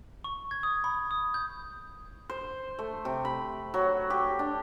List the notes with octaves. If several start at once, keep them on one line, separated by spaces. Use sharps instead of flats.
C#6
G#6
D#6
B5
D#6
G6
C5
A3
C3
B5
F#3
G4
D4